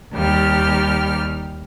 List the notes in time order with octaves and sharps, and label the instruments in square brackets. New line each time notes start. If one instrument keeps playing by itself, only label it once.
[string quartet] D#2 G3 G4 F6